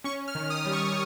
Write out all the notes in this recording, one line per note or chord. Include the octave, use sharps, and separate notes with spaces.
C#4 C#6
F6
D#3
D#6
G3
C#6